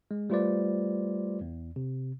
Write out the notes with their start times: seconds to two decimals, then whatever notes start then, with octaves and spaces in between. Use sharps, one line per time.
0.11 G#3
0.30 G3 A3 F4 B4 C5 D5
1.41 E2
1.76 C3